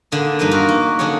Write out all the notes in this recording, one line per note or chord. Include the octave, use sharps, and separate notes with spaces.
D3 A#3 D4 G#4
G2 A#3 D#4 B4 D#5
F4 F#4 A#4
A#3
D3 F#3 C#4 G#4 C#5